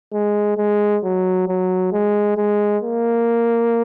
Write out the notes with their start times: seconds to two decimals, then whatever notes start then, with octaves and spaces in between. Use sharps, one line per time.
0.13 G#3
0.57 G#3
1.03 F#3
1.48 F#3
1.92 G#3
2.37 G#3
2.82 A#3